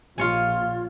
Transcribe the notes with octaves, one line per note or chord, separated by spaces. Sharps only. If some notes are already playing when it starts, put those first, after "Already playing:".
A#1 F4 C#5 G#5